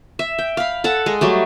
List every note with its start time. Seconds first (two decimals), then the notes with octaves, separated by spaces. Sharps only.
0.19 E5
0.39 G5
0.57 F5 B5
0.84 A4 F#5 A5
1.06 G#3 D#5
1.21 F#3 G3 A3